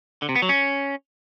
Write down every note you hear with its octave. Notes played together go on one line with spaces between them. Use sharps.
D3
C3
B3
F#3
C#4